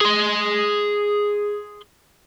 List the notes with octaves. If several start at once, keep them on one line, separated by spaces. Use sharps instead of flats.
G#4 C6